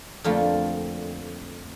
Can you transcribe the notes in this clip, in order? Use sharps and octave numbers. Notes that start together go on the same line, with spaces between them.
F2 D3 F3 A3 A#3 F4